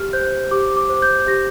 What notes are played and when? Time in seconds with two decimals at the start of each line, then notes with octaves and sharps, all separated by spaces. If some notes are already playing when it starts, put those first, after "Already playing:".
Already playing: G4 F6
0.13 C5 G6
0.51 G4 D6
0.77 D6
0.89 C5
1.02 G6
1.20 G6
1.27 G4 A#6